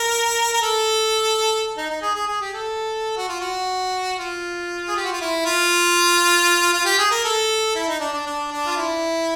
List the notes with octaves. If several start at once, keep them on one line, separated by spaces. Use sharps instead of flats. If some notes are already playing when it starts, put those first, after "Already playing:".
Already playing: A#4
A#4
A4
D#4
D#4
G#4
G#4
G#4
G4
A4
F#4
F4
F#4
F4
G#4
G4
F#4
F4
E4
F4
F4
G4
G#4
A#4
A4
E4
D#4
D4
D4
D4
D4
F4
E4